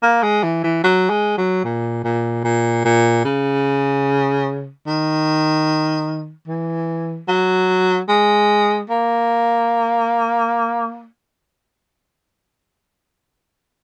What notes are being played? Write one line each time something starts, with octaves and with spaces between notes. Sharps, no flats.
A#3
G#3
E3
E3
F#3
G#3
F#3
A#2
A#2
A#2
A#2
C#3
D#3
E3
F#3
G#3
A#3